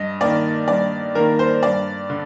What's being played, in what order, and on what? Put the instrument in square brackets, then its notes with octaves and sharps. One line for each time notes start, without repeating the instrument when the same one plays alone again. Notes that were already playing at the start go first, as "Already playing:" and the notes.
Already playing: [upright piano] G2 D#5
D#3 A#3 D5
G2 D5
D#3 A#3 A#4
C5
G2 D5
D3